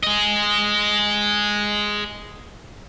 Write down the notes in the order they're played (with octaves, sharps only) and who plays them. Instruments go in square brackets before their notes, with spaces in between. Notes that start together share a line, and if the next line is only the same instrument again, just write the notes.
[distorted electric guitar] G#4 D#5